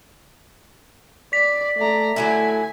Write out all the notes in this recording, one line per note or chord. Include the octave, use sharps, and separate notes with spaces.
D5 B6
A3 D5 A#5
D3 F#3 A3 E4 G#5